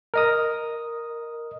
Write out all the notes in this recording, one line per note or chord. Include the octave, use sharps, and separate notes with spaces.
A#4 D#5 D#6